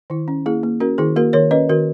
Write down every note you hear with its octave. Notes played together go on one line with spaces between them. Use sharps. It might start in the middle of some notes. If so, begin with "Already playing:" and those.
D#3 E4
C#4
A#3 E4 G#4
A#3
C#4 F#4 A#4
D#3 E4 G#4
A#3 F#4 A#4
D#3 A#4 C#5
C#4 B4 D#5
D#3 F#4 A#4